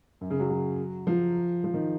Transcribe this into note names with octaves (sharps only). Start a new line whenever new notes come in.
F#2
C#3
F#3
F#3
F3
F3
D#3